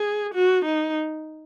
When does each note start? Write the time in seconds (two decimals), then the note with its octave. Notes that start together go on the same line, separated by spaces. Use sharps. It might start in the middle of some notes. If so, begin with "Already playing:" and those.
Already playing: G#4
0.34 F#4
0.65 D#4